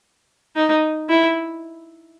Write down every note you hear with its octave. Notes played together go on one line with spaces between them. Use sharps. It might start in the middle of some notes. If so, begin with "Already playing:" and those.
D#4
E4